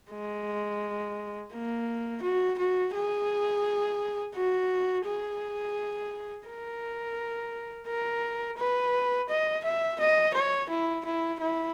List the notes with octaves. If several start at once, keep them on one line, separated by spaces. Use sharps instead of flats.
G#3
A#3
F#4
F#4
G#4
F#4
G#4
A#4
A#4
B4
D#5
E5
D#5
C#5
E4
E4
E4